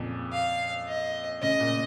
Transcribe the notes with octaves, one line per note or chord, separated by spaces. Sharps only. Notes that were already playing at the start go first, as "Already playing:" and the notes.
Already playing: F2 A#2 C#3
F5
D#5
C#3 D#5
A#2